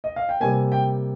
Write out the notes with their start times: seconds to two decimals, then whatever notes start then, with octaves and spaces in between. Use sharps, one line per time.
0.04 D#5
0.16 F5
0.29 G5
0.40 C3 G3 A#3 G#5
0.72 G5